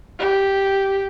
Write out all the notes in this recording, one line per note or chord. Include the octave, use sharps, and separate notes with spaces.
G4